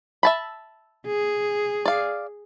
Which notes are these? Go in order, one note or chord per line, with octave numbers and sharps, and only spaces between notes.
E5 A5 B5
G#4
D5 F5